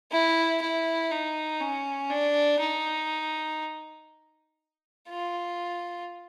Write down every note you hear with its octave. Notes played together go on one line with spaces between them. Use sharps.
E4
E4
D#4
C#4
D4
D#4
F4